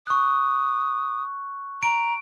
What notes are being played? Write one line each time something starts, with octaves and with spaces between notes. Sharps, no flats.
C#6 D#6 F#6
A#5 D7